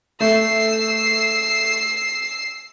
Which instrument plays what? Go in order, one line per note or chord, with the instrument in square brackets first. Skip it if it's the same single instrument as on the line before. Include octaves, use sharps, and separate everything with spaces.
[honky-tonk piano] A3 [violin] E6 C7